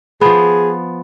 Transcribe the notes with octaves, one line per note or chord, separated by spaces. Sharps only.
F3 B3 G#4